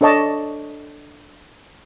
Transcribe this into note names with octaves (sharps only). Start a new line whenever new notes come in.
D4 A4 C#5 D#5 A5 D6